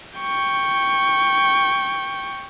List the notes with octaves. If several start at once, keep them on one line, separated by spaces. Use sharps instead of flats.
G5 C#6